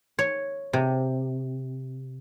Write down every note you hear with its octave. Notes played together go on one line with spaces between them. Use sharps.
C#5
C3